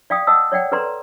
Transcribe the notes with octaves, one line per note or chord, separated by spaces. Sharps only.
D5 F5 G5 D#6
D#5 F#5 A5 D#6 E6
C#5 D5 F#5 G5
A4 B4 D5 A#5 C6